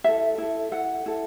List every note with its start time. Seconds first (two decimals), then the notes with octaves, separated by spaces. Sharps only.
0.04 E4 A4 E5
0.38 E4 A4
0.71 E4 A4 F#5
1.06 E4 A4